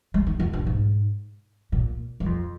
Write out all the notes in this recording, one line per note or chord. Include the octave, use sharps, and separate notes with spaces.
G#3
D#3
F2
G2
G#2
A#2
G2
F2